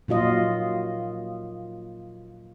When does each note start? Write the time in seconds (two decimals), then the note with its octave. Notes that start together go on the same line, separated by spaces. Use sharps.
0.08 A#2 F#3 F4 D#5